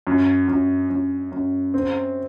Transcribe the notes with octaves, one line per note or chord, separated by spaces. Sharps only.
F#2
F#2
F#2
F#2
C4